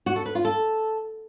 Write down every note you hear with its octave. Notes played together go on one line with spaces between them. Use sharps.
F#4
A4
B4
F4
A4